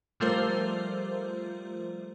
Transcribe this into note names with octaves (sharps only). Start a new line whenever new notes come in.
F3 G3 A3 F4 A#4 C5